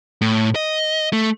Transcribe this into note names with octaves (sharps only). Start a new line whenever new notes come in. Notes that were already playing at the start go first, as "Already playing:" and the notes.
A2
D#5
A3